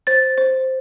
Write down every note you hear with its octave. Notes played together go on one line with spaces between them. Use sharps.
C5 A6
C5